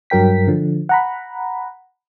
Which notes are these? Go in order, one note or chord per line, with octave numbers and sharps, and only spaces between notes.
G2 F#3 A#4 G5 B6
D3 F3
F#5 A#5 B5